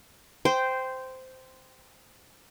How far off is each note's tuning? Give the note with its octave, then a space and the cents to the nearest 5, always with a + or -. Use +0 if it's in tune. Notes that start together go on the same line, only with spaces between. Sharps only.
C5 -10 G5 +0